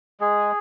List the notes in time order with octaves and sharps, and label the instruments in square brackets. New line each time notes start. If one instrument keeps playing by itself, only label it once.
[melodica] G#3 G#4